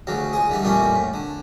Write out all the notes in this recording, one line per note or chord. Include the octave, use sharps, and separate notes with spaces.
D2 C#3 F#3
C#2 G#4
D3 E3 G3
F2 A#2 G3 A3 C#4
A2
D3